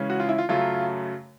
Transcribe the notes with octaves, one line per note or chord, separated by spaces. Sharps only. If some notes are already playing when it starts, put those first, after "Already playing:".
Already playing: C#3 E3 G#3 C#4
F#4
F4
E4
F4
F#2 C#3 F#3 A3 F4